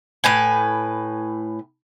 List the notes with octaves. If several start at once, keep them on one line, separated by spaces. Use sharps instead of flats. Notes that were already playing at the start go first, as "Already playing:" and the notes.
A2 B4 G#5